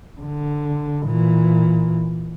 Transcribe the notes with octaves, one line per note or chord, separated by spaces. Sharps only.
D3
A#2 E3